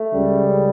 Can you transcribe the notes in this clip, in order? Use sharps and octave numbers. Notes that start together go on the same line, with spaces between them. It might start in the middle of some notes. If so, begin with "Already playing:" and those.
Already playing: A3
C#2 C#3 G3